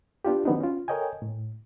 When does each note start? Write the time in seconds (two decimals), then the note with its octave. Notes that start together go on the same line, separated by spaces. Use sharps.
0.25 B3 D4 F4 G4
0.45 D#3 F#3 B3 C4 D4 D#4
0.60 C#4 F4
0.88 A4 A#4 C#5 D#5 G5 G#5
1.22 A2